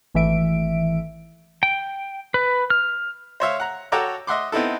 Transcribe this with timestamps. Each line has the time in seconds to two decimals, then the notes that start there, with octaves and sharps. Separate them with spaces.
0.14 G#1 E3 A3 E5 D7
1.63 G5
2.34 B4
2.70 F6
3.40 C5 C#5 E5 F5
3.60 F#5 A#5
3.92 F#4 A4 C#5 G5 A#5 D6
4.27 D#5 E5 F#5 C6 D6
4.52 B3 C4 D#4 E4 A4